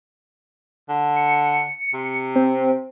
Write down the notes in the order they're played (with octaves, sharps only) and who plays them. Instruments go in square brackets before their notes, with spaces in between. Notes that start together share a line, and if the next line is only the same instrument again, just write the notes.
[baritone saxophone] D3
[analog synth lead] C#7
[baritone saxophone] C3
[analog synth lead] C4